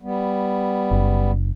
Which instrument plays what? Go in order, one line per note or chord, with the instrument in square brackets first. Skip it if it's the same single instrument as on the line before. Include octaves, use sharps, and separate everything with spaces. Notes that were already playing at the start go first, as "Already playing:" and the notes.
[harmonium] G3 B3
[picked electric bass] F#1